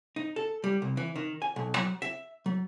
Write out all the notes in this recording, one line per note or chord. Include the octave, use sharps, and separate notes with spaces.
D#4
A4
G3
C2
E3
D#3
G#5
B1
F#3
E5
F#3